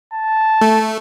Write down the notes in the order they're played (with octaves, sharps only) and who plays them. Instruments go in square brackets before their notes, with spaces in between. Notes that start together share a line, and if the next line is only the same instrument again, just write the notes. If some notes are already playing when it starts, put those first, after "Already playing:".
[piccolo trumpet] A5
[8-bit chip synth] A3